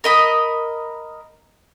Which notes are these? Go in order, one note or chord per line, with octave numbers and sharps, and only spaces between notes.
A#4 D#5 B5